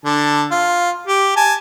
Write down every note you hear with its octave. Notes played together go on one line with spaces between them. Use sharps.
D3 A5
F4
G4
G#5 A5